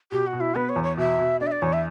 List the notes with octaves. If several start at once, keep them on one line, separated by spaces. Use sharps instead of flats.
B2 G4
F#4
B2
E4
B3 B4
C#5
E2
C#5
B2 E5
B2
D4 D5
E5
D5
E2 C#5
E5